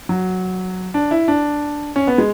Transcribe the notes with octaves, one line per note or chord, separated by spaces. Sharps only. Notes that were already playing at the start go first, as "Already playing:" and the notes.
F#3
D4
E4
D4
C#4
B3
G#3